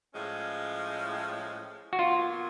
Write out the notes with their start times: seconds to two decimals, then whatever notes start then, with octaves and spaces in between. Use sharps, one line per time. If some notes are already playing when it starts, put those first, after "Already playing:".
0.13 A2 F3 G#3 C#4
1.93 F#4
1.98 B2 F#3 A#3 F4